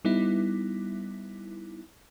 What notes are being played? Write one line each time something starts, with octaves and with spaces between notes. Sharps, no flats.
G3 B3 D#4 E4